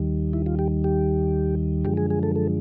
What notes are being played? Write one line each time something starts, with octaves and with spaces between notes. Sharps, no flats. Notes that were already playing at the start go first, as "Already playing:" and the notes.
Already playing: D#2 D#3 G3
E4
F4
G4
G4
F#2 D3 F3 G#3 G4
G#4
G#4
A4
A4